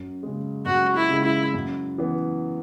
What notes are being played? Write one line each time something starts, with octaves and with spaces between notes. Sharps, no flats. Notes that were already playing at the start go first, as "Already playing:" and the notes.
Already playing: F#2
C#3 G#3
F#2 F#4
E4
C#3 G#3
E4
F#2
E3 B3